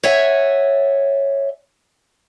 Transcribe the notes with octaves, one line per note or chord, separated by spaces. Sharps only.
C#5 E5 F#5 G#5